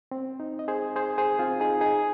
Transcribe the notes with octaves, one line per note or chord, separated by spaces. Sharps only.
C4
D#4
D#5
G#4 C5
G#4 C5
G#4 C5
C4 F4
D#4 G#4
D#4 G#4